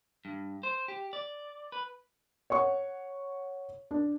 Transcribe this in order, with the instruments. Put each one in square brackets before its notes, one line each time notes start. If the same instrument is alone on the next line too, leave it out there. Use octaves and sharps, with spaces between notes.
[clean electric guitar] G2
C5
G4
D5
B4
[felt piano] C#5 F#5 C#6
D4